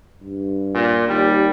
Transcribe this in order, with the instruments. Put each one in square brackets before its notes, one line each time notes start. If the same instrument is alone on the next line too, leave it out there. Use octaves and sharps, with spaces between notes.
[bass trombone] G2
[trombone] A#2
[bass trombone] D#2 [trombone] G3